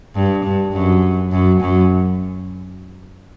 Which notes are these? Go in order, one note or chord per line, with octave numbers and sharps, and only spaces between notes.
G2
G2
F#2
F#2
F#2